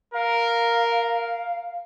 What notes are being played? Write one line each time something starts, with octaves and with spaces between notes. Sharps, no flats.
A#4 F5